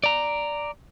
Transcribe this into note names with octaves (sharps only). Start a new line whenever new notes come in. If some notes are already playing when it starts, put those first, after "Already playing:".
D5 A#5